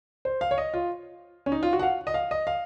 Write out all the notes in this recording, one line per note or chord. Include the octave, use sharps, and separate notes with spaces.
C5
F5
C#5
D#5
F4
C#4
D#4
F4
F#4
F#5
F5
D#5
F5
D#5
F5